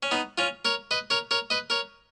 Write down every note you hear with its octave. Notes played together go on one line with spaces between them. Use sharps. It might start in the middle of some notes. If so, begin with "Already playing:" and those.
C#4
B3 D#4
C#4 F4
A#4 C#5
B4 D#5
A#4 C#5
A#4 C#5
B4 D#5
A#4 C#5